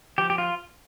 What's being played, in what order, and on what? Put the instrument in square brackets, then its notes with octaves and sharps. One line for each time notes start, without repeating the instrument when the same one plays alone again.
[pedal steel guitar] F3 G4
G4
F4